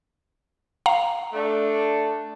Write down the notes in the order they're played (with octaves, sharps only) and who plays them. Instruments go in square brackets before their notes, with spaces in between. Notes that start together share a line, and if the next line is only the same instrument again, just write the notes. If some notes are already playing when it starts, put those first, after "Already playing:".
[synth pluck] F5 F#5 A#5
[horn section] A3 D4